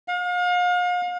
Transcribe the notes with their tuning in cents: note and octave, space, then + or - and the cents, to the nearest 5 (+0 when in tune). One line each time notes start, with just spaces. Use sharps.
F5 +40